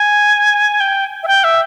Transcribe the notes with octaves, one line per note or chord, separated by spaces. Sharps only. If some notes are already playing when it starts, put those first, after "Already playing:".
Already playing: G#5
G5
E5
G5
E5